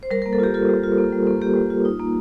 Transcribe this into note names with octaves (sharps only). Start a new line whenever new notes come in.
C5
G3 A#4
A#4
A#3
A4
F4 G4
F4 A4
G3
F4
A#3
G3
A#3
A#3 G4
G3
F4
D#4
A#3